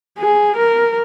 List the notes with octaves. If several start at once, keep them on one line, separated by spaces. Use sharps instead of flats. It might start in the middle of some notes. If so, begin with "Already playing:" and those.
G#4
A#4